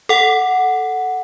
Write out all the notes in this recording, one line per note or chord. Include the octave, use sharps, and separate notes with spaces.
A4 F#5